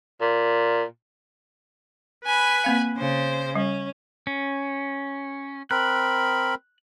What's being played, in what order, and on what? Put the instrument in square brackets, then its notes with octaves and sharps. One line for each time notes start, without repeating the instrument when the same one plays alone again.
[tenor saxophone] A#2
[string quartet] B4 G#5 B5
[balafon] A#3 C4 F5
[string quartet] C#3 C5
[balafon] G3 [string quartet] C#4
[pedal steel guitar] C#4
[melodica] C4 A#4 B5 [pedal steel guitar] F#6